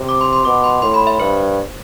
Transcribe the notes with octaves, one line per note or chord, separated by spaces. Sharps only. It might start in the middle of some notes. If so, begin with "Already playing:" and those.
Already playing: C3
D6
C6
C6
B2 D6
C6
A2 C6
B5
E5
G2 C5